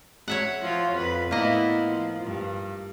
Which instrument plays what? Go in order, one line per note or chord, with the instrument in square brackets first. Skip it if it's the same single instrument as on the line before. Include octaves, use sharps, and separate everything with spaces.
[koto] C#5 E5 F#5
[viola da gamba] F3 F4
F2 B4
[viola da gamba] A2 B3 E4 [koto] A#3 D#5
[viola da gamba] F3
G2